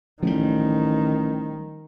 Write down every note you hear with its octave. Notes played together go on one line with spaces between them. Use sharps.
A1 D#3 F3 G3